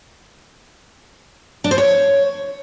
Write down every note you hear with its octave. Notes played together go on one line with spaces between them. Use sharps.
D4
C5
C#5